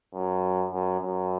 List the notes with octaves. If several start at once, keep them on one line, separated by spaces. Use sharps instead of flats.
F#2
F#2
F#2